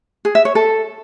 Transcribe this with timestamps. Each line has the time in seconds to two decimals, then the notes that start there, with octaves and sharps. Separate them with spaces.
0.25 G#4
0.35 E5
0.45 C#5
0.55 A4